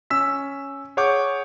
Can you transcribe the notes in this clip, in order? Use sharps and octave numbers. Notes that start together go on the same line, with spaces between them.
C#4 E6 B6
G#4 C#5 F#5 C#6 D6 G6